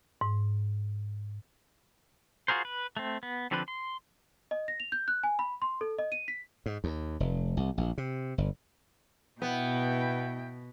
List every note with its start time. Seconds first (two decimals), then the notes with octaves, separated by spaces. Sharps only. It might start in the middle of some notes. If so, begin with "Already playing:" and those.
0.21 G#2
2.48 F4 F#4 G#4 A#4 C5
2.65 B4
2.97 A3 C4
3.23 B3
3.51 D3 F3 C4 D4 B4
3.68 C6
4.51 D#5
4.68 A#6
4.80 F7
4.92 G6
5.08 F#6
5.23 G#5
5.39 B5
5.62 C6
5.81 A4
5.99 D#5
6.12 D#7
6.28 B6
6.66 G#2
6.84 D#2
7.20 F1
7.57 C2
7.78 A#1
7.98 C3
8.38 G1
9.42 B2 B3 E4 G5